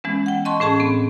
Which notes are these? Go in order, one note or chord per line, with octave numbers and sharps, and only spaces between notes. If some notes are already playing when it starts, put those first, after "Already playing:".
E3 G#3 B3 C#4
F#5 G5
D#5 A5 C6 C#6
A2 C#4 G#4 A5
B3 C4